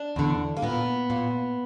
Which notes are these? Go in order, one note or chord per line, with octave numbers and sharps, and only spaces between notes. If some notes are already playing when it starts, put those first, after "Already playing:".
Already playing: D4
E2 D3
A#3
A#2 B3
A#2